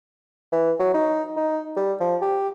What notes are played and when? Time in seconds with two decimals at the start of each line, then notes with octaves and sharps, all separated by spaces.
0.52 E3
0.79 F#3
0.94 D#4
1.37 D#4
1.77 G3
2.00 F3
2.22 G4